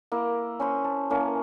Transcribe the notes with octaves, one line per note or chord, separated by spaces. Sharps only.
A#3 E4
C#4 C5 B5
A5
E3 A#3 C#4